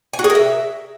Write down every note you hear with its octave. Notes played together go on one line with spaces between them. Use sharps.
G#5
F#4
G#4
A#4
E5